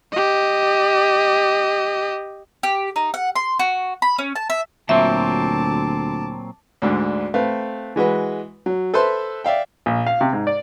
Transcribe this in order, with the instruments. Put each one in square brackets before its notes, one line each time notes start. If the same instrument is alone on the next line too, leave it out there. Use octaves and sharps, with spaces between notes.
[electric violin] G4 D#5
[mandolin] G4
D#4
F#5
C6
F#4
B5
C#4
A5
E5
[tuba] D2 [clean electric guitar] A#2 F#3 C4 [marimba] E5 [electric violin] A5 D6
[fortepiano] D2 G#2 D3
A3 C4 B4 F5
E3 G#3 F#4 B4
F#3
A4 B4 C5 E5 C6
D5 E5 F5 G5
A#1
F5
C3
G#2
D5